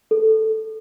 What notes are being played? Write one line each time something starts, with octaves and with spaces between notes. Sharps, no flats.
A4